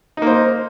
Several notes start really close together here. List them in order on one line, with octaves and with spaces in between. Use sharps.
D#4 A#3 C5